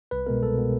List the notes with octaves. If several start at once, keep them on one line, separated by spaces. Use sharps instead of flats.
C2 B4
B2 G#3 B3 A#4
C2 A4
B2 G#3 B3